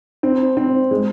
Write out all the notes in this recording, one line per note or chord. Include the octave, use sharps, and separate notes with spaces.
C4
C4
G#3